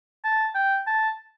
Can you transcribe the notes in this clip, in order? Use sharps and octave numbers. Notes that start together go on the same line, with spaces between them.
A5
G5
A5